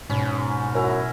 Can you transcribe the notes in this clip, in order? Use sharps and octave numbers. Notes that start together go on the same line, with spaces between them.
G#2 B2 C#4 A#5 B5
F#2 E4 A#5